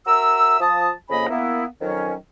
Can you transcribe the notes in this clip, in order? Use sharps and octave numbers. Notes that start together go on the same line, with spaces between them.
F#4 A#4 E5 E6
F3 A5 D#6
F2 C#3 A#3 D#5 G#5 B5
A#3 B3 E4
F2 D#3 F#3 C#4